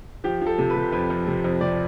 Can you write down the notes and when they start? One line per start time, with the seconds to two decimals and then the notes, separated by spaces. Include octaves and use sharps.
0.24 F3 G4
0.41 F3
0.47 A4
0.58 C3
0.70 B4
0.76 C3
0.92 F2 B4
1.10 F2
1.27 C3
1.44 F2
1.61 C3 D5